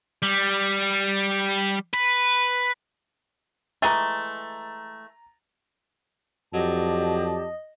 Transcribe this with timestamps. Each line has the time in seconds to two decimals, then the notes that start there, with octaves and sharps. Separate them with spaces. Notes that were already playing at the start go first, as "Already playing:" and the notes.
0.22 G3
1.93 B4
3.82 E3 G#3 A3 A#5 A6
6.53 F2 F#3 G4 D5 D#5 A5